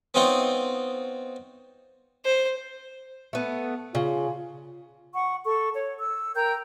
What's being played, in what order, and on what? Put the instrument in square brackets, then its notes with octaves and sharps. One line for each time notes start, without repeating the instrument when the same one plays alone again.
[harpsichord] B3 C4 D#4 F4 C#5
[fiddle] C5
[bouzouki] A3 B3
[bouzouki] C#3 [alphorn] F4
[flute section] F#5 C#6
A4 C#6
C#5
E6
A#4 G5 A#5 G6